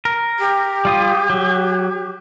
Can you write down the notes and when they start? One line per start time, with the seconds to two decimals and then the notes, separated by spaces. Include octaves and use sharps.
0.05 A#4
0.38 G4
0.85 G3 F4 D#6
1.30 F#3